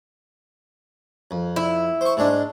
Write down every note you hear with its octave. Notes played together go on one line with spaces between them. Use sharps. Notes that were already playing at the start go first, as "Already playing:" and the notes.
F2
E4
C5 C#6
G#2 G#3 D4